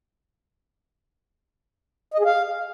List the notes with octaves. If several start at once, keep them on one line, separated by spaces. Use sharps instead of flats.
D#5
G#4
F5